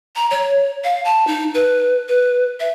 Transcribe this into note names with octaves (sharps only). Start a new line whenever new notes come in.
A#5
C#5
F5
A5
D#4
B4
B4
E5